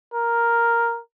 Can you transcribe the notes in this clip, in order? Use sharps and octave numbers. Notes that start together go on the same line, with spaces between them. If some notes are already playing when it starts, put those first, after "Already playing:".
A#4